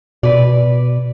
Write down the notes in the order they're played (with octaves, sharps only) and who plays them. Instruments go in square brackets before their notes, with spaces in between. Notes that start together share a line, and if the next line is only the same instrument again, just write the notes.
[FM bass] B2 [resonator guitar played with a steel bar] B4 D5